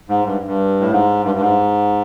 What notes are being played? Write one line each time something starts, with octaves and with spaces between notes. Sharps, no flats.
G#2
G2
G2
A2
G#2
G2
G2
G#2